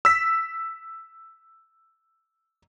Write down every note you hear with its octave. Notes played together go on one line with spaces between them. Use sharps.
E6 B6